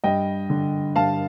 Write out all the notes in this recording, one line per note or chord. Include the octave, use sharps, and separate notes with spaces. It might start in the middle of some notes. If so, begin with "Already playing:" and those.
G2 D#5 G5
D3
G2 F5 A5